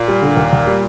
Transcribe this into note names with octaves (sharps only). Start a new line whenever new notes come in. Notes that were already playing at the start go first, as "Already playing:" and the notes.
Already playing: A#2
G3
D3
D#2
D#2
G3